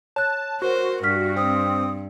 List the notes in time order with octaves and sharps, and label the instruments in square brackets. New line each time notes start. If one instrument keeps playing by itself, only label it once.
[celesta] C#5 F#6 [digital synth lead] A5
[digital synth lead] F#4 [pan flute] A#4 [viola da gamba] C5
[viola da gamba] G2 [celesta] F6 B6
[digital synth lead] C4 [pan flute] D#6